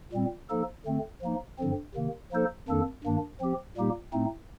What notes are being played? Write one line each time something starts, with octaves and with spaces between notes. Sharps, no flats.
A#2 G3 C4
F3 A#3 D#4 A4
D3 A3 C4
F3 A#3 D#4
G2 D3 F3 C4
C3 D#3 A#3
F3 A#3 D#4 A4 C5
F2 D#3 A#3 D4 A4
G2 D#3 A#3 D4
F3 C4 G4
A#2 G3 A#3 D#4 G4
A2 A3 C4 D#4